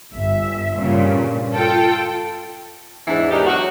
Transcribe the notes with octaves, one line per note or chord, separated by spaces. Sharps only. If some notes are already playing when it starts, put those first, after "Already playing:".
G1 E5
G2 A#2 C#3
F4 A4 G5
E2 G#2 E3 D4
E2 D4 D#4 G4 A#4
F#3 F#4